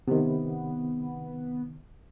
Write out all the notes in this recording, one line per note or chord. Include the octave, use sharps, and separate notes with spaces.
C3 D#3 B3